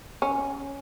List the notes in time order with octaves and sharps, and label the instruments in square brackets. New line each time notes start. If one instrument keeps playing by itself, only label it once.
[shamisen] C#4